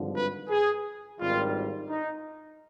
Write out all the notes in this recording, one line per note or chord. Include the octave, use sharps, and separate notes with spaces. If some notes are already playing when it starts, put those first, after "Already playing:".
Already playing: G#1 G2 D3 F3
B4
G#4
G#1 G2 D#3 G3 F4
D#4